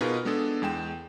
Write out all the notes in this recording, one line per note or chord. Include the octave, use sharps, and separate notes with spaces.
B2 D#4 F4 G#4 A#4 B4
G#3 B3 D4 G#4 A4
E2 G#3 G5 E7